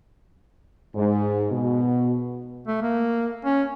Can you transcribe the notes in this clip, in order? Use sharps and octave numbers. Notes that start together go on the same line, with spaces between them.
G#2
B2
A3
A#3
C#4